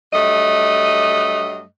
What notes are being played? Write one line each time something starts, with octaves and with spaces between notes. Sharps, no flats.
G2 F#3 A3 D#5